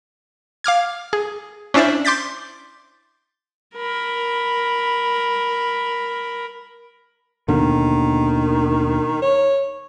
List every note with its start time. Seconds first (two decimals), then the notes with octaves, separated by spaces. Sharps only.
0.64 F5 D6 F6 G#6
1.13 G#4
1.74 C#4 D4 E4 C5 D5 E5
2.05 C6 D6 G6 A6 B6
3.76 A#4 B5
7.48 D#2 B2 D3 D#3
9.22 C#5